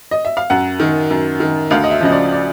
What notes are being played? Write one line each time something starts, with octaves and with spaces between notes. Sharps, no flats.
D#5
E5
F5
F#2 F#5
D#3
F#2
D#3
D2 F5
D#5
E5
C#3 F3 D#5
D5
D5